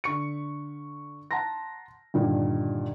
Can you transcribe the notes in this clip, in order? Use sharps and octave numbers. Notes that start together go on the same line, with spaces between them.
D3 C#6 C#7
F#5 A5 A#5 C6 A#6
G2 A#2 D3 D#3